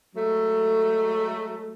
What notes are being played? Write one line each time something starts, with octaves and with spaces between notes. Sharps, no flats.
F#3 G#3 A3